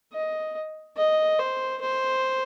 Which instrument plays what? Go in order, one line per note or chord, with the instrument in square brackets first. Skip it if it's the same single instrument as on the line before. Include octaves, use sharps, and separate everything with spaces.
[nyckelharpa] D#5
D#5
C5
C5